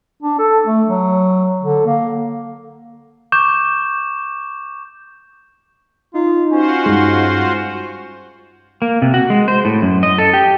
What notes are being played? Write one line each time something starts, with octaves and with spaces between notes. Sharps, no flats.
D4
A4
A3
F#3
D3
A#3
C#6 D6 G6 E7
D#4 F4
C#4 F4 F#4 C5
G2 G#3
A#3
C3
F#4
G#3
C5
A2
F#2
D#5
A4
G4